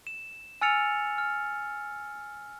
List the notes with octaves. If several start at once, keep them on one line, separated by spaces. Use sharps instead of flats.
E7
G#5 E6 F6 A6 C#7 F7
F6